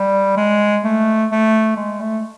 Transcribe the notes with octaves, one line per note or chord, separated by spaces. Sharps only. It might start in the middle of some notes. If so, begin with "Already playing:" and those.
Already playing: G3
G#3
A3
A3
G#3
A3